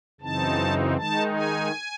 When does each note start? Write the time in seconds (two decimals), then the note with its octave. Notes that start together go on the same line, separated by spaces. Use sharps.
0.21 F#2 C#3 E3 C4 D#4 A5
0.96 D#3 G#3 D#4 A5
1.34 G#5